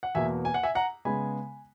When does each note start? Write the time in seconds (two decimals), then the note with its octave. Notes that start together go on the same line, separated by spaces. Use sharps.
0.03 F#5
0.15 E2 B2 A#3 E5 G#5
0.45 G#5
0.54 F#5
0.63 E5 G#5
0.75 F#5 A#5
1.05 C#3 G#3 B3 G#5 B5